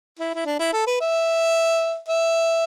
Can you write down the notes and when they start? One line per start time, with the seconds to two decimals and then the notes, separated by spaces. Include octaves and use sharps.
0.19 E4
0.35 E4
0.46 D4
0.60 E4
0.73 A4
0.87 B4
1.01 E5
2.08 E5